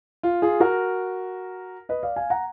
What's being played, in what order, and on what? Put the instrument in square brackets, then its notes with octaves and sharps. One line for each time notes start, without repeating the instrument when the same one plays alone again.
[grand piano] F4
F4 G#4
F#4 A#4
B4 D#5
D5 F5
F5 G#5
F#5 A#5